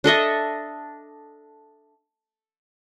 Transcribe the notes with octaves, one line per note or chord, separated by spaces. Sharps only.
D4 A4 D#5 E5